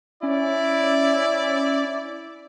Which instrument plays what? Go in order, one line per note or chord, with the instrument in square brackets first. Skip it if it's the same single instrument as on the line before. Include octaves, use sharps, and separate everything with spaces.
[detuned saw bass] C#4 [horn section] E4 D5